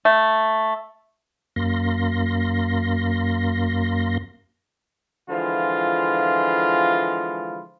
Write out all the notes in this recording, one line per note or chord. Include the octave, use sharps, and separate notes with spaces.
A3
F#2 A#3 C6 A#6
D3 E3 F3 G#3 F4 B5